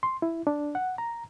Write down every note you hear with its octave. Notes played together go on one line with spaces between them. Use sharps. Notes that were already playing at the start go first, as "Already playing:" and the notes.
C6
E4
D4
F#5
A#5